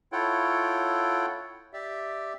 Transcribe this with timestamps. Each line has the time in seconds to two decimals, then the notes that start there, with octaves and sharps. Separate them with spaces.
0.12 E4 F4 A4 C#5 F#5 G5
1.73 G4 D5 E5